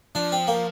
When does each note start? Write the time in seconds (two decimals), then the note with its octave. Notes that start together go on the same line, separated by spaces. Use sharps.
0.15 F3 D4
0.32 C4
0.47 A#3